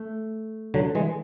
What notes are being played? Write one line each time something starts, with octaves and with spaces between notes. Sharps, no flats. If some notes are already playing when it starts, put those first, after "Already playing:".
Already playing: A3
D3 F#3
E3 G#3